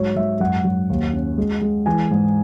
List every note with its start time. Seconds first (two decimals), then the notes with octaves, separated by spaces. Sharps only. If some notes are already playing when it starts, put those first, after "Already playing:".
Already playing: G#2 F#3 C#5
0.16 G#2 E5
0.40 F#2 F#5
0.64 F#2
0.90 D#2
1.13 C#4
1.38 G#3
1.61 G#3
1.86 E3 G#5
2.11 G#2